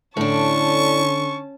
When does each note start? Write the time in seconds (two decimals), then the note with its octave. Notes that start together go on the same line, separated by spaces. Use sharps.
0.17 A2 D3 C#4 D4 A5 C#6